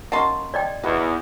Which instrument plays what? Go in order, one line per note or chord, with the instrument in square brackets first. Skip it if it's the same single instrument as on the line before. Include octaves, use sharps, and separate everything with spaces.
[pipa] A#3 A5 C6 [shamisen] C#4 D#4 F#4
[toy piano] D5 D#5 G5
[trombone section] E2 [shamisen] D#4 F#4 B4